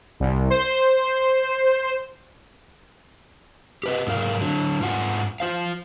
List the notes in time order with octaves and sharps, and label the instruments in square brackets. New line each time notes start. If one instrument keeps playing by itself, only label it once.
[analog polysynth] C2
C5
[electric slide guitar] G4 B4 D#5
G#2 F#3 A#4 F5
D3 F#3
G#2 F4 F#5 G#5
F4 C5 F5